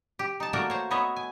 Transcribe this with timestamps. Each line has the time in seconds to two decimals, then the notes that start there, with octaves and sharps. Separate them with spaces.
0.19 G4
0.40 D#4 A5
0.53 A3 A#3 F#4 A#4 D5
0.70 C5 C#5
0.91 B3 B4 C#5 D#5 E5
1.16 G#5